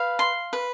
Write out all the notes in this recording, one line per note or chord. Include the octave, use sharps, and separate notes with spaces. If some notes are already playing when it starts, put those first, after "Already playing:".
Already playing: B4 F5
C6
B4